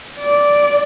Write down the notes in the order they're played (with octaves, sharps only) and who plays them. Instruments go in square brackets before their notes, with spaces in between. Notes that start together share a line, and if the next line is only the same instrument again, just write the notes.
[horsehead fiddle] D5